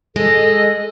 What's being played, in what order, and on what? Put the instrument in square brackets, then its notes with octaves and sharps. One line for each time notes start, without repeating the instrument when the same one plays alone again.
[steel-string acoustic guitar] G#3 [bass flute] A4 [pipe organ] D#5